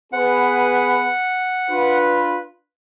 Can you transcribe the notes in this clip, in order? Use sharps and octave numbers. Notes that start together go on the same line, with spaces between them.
B3 G#4 B4 F#5
D4 F4 B4